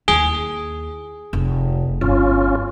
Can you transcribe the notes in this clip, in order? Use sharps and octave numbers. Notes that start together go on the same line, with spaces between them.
D#2 E4 G#4
F1
G1 C#4 F4